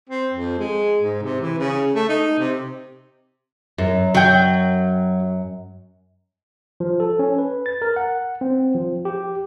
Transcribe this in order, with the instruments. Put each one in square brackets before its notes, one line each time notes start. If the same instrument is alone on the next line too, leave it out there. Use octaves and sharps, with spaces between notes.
[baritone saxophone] C4
F2
G#3
G#2
C3
E3
C#3
A3
D#4
C3
[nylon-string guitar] F#2
[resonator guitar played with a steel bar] F#3 G5
[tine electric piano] F3
A4
C#4
B4
A6
A#4
F#5
C4
F3
G4